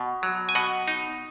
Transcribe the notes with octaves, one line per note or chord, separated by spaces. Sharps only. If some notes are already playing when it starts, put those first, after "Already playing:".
Already playing: B2
F#3
G#5
B2 D#5 F#5
D#4